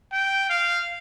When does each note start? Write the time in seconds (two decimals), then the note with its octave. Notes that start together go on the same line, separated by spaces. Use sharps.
0.12 G5
0.49 F5